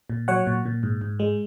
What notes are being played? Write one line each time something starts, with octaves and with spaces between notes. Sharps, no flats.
A#2
F#3 C#5 F#5
A#2
A#2
G#2
G#2
G#3